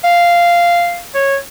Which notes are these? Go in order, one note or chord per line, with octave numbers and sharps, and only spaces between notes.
F5
C#5